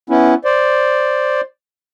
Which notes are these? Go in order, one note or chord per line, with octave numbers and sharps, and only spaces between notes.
B3 C#4 E4
C5 D5